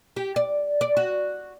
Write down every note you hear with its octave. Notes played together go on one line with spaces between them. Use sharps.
G4
D5
D5
F#4